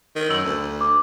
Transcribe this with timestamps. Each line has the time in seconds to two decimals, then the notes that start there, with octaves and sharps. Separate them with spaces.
0.16 D#3
0.30 F#2 E6 F#7
0.45 D2
0.81 D6